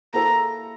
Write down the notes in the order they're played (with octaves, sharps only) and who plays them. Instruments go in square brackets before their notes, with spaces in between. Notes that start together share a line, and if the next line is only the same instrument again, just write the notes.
[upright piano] A#3 E4 A4 [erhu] A#5